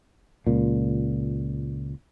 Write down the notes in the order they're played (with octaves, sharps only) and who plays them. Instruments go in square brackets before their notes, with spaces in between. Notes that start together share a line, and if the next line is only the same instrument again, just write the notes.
[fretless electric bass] C#2 A#2